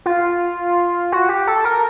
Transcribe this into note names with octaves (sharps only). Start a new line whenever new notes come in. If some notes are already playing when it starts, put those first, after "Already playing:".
F4
F#4
G4
A4
A#4